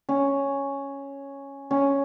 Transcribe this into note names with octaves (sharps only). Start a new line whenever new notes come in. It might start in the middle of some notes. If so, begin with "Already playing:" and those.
C#4
C#4